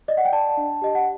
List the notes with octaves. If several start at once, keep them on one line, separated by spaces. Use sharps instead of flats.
D5 D#5
F#5
G5
D5 A5
D4
G4 D#5
F#5